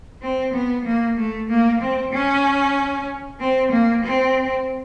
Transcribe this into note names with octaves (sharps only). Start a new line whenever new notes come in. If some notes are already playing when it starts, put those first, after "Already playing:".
C4
B3
A#3
A3
A#3
C4
C#4
C4
A#3
C4